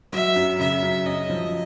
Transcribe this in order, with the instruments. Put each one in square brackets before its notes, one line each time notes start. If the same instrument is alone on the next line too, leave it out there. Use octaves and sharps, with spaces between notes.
[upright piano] F#3 [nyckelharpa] E5
[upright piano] F#2
[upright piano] C#3 [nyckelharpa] E5
[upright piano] F#2
[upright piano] C#4 [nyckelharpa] D#5
[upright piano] F3